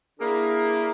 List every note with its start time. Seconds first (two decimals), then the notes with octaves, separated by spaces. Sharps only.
0.20 A#3 D4 E4 G#4 A#4